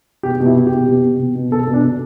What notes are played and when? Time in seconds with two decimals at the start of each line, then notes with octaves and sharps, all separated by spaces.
0.23 B2 G4
0.40 B2
0.46 E4
0.56 B2
0.67 G4
0.72 B2
0.88 B2
1.04 B2
1.19 B2
1.35 B2
1.51 B2 A4
1.67 B2
1.73 D4
1.84 B2